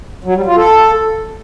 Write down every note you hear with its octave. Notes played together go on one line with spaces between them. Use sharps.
F#3
G3
F4
A4